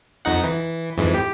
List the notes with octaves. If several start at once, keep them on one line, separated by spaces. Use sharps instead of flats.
F2 D#4 F#5
E3
F2 G#2 E3
G4